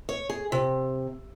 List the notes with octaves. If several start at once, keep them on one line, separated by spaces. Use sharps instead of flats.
C#5
G#4
C3